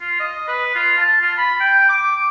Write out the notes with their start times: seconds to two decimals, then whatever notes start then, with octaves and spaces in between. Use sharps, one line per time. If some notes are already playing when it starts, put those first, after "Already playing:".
0.01 F4
0.19 D#5
0.48 B4
0.75 F4
0.98 A5
1.21 F4
1.38 B5
1.60 G5
1.88 D6
2.12 D6